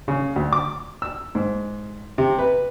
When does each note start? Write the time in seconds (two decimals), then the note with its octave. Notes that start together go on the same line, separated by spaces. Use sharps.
0.08 C#3
0.36 D2
0.53 D6
1.02 E6
1.35 G#2
2.18 C3
2.38 B4